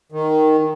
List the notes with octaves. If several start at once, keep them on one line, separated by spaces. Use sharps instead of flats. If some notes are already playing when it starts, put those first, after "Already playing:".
D#3